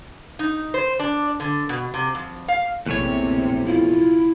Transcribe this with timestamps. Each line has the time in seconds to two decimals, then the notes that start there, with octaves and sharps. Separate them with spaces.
0.39 D#4
0.74 C5
1.00 D4
1.40 D3
1.69 B2
1.94 C3
2.15 F2
2.48 F5
2.86 A#1 E2 C3 A3 C#5
3.67 E4 F4